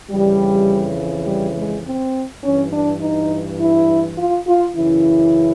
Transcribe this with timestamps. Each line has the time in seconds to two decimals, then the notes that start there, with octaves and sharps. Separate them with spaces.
0.11 F2 C#3 E3 G3
1.27 G3
1.57 G#3
1.85 C4
2.44 G2 E3 C#4
2.73 D4
3.02 D#4
3.60 E4
4.18 F4
4.48 F4
4.77 F#2 C#3 E3 E4